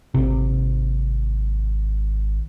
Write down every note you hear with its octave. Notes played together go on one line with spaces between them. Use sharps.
G#1 C3